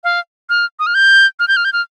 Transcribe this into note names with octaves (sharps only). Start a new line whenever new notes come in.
F5
F6
D#6
F6
G6
F6
G6
F6
G6
F6